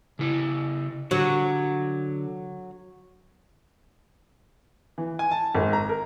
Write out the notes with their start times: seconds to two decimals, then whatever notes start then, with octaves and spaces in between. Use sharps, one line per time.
0.19 C#3 E4
1.11 D3 F#3
4.98 E3
5.19 G#5
5.31 A5
5.55 G#1
5.73 A#5
5.89 A#4